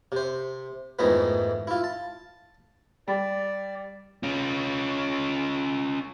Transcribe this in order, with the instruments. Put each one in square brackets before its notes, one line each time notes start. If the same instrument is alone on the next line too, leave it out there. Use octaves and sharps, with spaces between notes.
[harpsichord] C3 C5
F2 G#2 D#3 E3 A3 B3
E4 F4
A5
[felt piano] G3 [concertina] D5
[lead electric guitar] C#4 F4